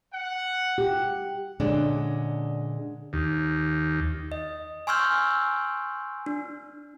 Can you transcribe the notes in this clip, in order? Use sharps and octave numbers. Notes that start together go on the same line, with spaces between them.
F#5
G4
A#2 D3 G#3 C#4 D4
D#2
D#5
G#5 C6 C#6 E6 F6 G6
D4